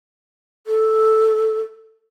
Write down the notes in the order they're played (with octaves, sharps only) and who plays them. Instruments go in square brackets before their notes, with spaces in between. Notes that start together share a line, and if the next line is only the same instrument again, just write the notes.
[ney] A4